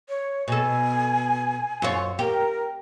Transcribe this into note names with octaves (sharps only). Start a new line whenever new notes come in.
C#5
B2 A4 G#5
F#2 F4 C#5
G4 A#4